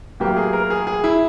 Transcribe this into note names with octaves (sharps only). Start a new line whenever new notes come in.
A2 F#3 A#3 G4
G#4
A#4
G#4
G#4
E4